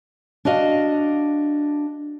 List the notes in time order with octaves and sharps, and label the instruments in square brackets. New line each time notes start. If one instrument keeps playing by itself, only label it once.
[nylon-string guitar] D4 F#4 D#5 F5